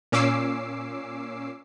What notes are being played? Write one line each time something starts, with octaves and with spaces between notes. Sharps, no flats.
A#2 C#4 D6 E6 C7